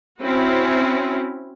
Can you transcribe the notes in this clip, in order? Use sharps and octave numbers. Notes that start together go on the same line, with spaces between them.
C4 C#4 E4 F#4